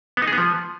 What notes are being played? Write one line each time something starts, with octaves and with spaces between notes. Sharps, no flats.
B3
D#4
G#4
B3
F3